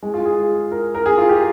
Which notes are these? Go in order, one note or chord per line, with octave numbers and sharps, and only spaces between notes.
G#3
F4
G#4
A#4
A#4
G#4
F4
G4